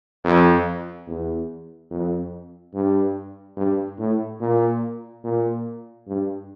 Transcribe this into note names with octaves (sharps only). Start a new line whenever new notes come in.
F2
E2
F2
G2
G2
A2
A#2
A#2
G2